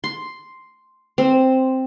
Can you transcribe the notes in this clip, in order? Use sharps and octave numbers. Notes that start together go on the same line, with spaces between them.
C6
C4